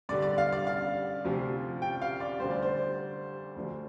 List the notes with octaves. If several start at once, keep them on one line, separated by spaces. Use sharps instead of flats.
G2 D3 G3 D5
D5
F5
D5
F5
D2 C3 F3
G5
F5
D5
D2 D3 G3 C5
D5
C5
D2 D3 F3